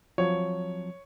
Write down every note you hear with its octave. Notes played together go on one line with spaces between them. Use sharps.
F3 F#3 C4 C#5